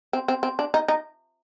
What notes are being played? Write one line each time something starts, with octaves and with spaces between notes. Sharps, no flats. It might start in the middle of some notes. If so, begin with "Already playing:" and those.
C4
C4
C4
D4
D#4
D#4